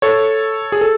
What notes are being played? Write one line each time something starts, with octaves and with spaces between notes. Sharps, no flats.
A4 C#5
G#4
A4